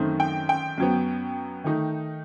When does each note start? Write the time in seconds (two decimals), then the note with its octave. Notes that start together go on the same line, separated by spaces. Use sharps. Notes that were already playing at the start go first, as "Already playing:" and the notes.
Already playing: F#2 D#3 A3 C4 D#4
0.20 G5
0.49 G5
0.78 F#2 F#3 B3
1.64 D#3 A3 D#4